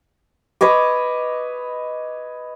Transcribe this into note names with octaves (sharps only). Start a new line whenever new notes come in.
B4 C#5 D#5 D6